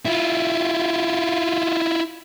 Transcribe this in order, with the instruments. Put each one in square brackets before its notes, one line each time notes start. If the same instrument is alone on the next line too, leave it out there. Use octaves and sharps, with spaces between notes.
[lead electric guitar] E4 F4